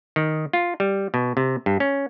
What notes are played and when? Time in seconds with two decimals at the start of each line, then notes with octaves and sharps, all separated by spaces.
0.16 D#3
0.53 F4
0.80 G3
1.14 B2
1.37 C3
1.66 G2
1.80 C#4